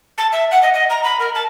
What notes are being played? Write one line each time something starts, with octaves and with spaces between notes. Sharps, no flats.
A5
E5
F#5
D#5
D#5
A#5
B5
A#4
A5